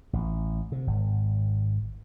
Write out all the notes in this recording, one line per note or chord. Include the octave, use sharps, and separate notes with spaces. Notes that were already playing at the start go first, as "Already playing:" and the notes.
A1
C3
G#1